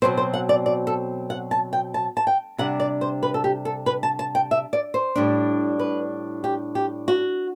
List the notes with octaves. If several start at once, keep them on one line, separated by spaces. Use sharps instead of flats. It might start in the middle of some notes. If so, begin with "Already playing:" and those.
B2 F#3 C4 C5
C5
F#5
D5
D5
A4
F#5
A5
G5
A5
A5
G5
C3 G3 D4 F#5
D5
C5
B4
A4
G4
A4
B4
A5
A5
G5
E5
D5
C5
A2 G3 D4
B4
G4
G4
F#4